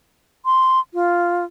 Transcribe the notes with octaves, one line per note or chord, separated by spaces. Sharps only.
C6
F4